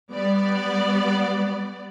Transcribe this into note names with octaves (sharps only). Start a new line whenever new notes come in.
G3 B3 D5